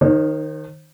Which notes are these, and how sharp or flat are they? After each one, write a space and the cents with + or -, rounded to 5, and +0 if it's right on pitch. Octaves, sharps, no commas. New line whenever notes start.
D#3 -5 D#4 -40 C5 +35